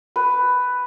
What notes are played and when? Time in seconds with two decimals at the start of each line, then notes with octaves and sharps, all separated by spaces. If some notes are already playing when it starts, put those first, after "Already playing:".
0.16 B4